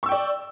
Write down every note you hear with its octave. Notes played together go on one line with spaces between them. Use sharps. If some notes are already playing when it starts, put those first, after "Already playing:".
D5 G5 C#6 E6